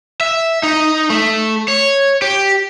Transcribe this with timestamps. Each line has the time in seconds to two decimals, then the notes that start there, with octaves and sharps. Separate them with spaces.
0.21 E5
0.63 D#4
1.10 A3
1.68 C#5
2.22 G4